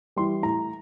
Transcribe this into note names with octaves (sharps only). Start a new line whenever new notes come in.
E3 G3 C6
A2 A#5